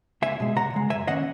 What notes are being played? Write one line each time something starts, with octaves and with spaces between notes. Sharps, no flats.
C#2 E5 G#5
B2 G#3
C#2 F#5 A#5
C#3 G#3
F#2 E5 G#5
D#3 A#3 C#4 D#5 F#5